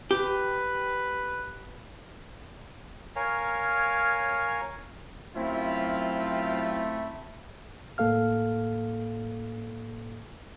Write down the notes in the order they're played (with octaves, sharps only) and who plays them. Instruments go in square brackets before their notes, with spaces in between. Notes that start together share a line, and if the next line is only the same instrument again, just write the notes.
[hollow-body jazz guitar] G4 [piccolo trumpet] B4
[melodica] A#4 C#5 F5 G#5
[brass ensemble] F#2 F#3 F4 [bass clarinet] A3 [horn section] C4 E4
[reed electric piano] A2 A#3 A4 F5 F6